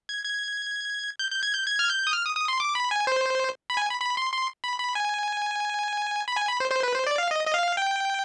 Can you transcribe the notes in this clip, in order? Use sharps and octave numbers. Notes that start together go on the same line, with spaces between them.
G#6
G#6
G6
G6
G#6
G6
G#6
F6
G6
D#6
F6
D#6
D#6
C6
D6
B5
G#5
C5
B5
G#5
B5
B5
C6
C6
B5
B5
G#5
B5
G#5
B5
C5
C5
B4
C5
D5
F5
D#5
D#5
F5
G5